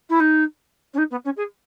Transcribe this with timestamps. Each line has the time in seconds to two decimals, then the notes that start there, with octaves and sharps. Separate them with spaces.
0.09 E4
0.20 D#4
0.93 C#4
0.98 D#4
1.11 B3
1.24 C#4
1.37 G#4